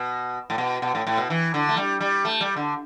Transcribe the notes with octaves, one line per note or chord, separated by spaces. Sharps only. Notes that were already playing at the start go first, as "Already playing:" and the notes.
Already playing: B2
A2
B2
B2
A2
A2
B2
E3
D3
A3
G3
G3
A3
G3
D3